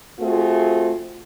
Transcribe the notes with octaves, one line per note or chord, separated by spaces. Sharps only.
A3 C4 F4 F#4 G#4